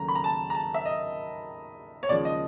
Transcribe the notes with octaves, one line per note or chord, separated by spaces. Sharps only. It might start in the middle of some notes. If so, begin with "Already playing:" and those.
Already playing: D#2 C#3 F#3 A3 A#5
B5
A#5
A5
A#5
A5
E5
D#5
C#5
D#2 C#3 F3 G#3 D5
D#5